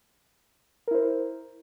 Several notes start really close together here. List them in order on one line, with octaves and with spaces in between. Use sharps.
A#4 E4 C5